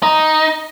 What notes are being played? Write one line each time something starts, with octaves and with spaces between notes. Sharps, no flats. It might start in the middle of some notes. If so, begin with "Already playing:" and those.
D#4